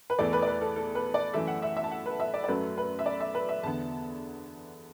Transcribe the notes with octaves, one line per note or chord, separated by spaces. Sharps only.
B4
E2 E3 A3 D5
B4
D5
B4
A4
A4
B4
D5
F#2 E3 A3 E5
F#5
E5
E5
A5
F#5
B4
E5
D5
D5
F#2 F#3 A3 B4
B4
E5
D5
E5
B4
E5
E2 D3 B3 A5